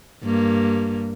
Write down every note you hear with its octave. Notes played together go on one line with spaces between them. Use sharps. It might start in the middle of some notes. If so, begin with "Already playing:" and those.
G2 A#3